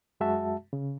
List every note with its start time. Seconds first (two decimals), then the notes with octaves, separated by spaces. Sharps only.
0.20 F#2 G#3 F#4 E5 A5
0.73 C#3